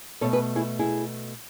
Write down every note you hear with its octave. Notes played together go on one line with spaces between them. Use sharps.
B2 A3 A4 C#5
G#4 B4
E4 G#4
E4 G#4